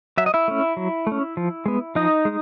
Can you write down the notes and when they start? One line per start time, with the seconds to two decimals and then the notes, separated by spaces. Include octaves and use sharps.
0.18 F#3 E5
0.26 D#5
0.34 E4 E5
0.48 A3 C#4
0.77 F#3
1.07 A3
1.12 C#4
1.37 F3
1.66 G#3 B3
1.95 F3 D#4 D#5
2.25 G#3